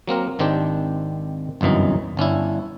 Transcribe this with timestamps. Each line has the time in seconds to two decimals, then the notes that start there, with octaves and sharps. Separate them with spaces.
0.08 F#3 A#3 C4 A#4
0.39 G#1 D#3 C4 D4 G4
1.61 G1 C2 F#2 E3 D#4
2.17 G1 C#4 D4 E4